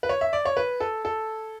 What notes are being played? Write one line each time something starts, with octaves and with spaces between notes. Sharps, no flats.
B4
C#5
E5
D5
C#5
B4
A4
A4